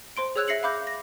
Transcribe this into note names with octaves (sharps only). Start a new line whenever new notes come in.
C5 C6 D7
G#4 C#5 E6 F#6 G#6 F7
E5 A#6 C7 C#7 F#7
F5 B5 D6 G6
A#6